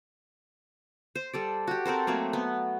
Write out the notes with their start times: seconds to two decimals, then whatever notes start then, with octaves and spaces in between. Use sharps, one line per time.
1.15 C5
1.33 G3 A4 D5
1.68 F#4 G4
1.86 C4 A4 A#4 C5
2.07 F#3 A3 A#3 C4
2.33 B3